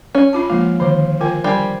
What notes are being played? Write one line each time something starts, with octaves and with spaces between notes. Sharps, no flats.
C#4
D4 F4 A5
F3 G#3 A#3 F4 F5
D3 D#3 C5
F4 A#4 G5 G#5
G3 D4 A#4 C5 G5 G#5